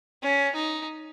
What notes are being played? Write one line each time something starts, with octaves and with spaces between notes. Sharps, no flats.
C#4
D#4